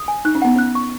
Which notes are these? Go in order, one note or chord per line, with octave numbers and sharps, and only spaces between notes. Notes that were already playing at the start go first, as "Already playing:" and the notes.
Already playing: D#6
G#5
D#4 F#6
C#4
B3 F#5
C#4 F#6
C#6